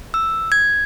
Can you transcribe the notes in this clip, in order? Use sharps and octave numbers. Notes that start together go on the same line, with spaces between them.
E6
G#6